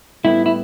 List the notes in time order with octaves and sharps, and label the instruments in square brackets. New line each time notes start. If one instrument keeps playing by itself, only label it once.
[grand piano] A2 G3 B3 [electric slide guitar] E4
[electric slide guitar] E4